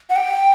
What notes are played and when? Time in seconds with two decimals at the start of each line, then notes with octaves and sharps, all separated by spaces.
0.10 F#5
0.16 G5